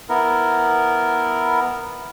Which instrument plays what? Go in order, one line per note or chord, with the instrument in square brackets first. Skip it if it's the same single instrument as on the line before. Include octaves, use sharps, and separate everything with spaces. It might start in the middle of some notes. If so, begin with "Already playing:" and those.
[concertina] B3 E4 A#4